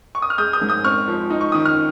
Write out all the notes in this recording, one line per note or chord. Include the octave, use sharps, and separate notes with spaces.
C#6
D#6
F6
G#3 D#6 G6
D#6 G6
G#2
D#6 G6
C4 C#6 F6
F3
D#4
C#6
D#3 D#6
F6